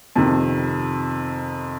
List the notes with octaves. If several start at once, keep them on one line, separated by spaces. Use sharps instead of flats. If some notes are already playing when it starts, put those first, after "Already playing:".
F2 C3 D#3